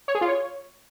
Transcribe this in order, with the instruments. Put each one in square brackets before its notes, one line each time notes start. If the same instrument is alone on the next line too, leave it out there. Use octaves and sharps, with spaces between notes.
[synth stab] C#5
G#4
F4
C#5